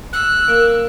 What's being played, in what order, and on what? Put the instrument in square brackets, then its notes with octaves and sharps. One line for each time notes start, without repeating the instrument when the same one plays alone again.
[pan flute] E6 [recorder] F#6
[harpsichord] A#3